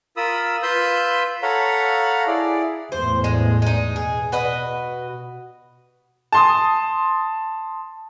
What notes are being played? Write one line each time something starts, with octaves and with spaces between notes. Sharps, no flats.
F4 A#4 B5 D#6 E6
F4 B4 B5 C6 E6 G6
A4 C#5 F5 F#5 A#5 B5
E4 G#4 D5
E2 A2 C5
G#3
G#3 D#4
B2 G#4
F#4 B4 D#5
A5 C6 D#6